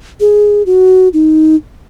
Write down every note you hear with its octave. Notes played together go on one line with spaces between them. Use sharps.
G#4
F#4
D#4